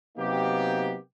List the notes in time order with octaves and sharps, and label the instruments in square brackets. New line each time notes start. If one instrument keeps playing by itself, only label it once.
[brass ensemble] C3 F#3 A#3 B3 D#4 G4